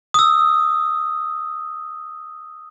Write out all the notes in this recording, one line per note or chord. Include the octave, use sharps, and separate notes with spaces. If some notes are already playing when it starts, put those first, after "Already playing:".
D#6 E6